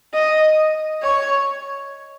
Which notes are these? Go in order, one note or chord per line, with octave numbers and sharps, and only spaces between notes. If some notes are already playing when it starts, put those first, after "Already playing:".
D#5
C#5